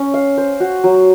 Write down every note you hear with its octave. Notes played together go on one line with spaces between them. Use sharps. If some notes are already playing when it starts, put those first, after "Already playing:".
Already playing: C#4
F5
C5
F#4
F#3